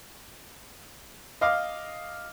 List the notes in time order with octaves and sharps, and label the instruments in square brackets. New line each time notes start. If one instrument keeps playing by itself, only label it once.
[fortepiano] D#5 F5 D6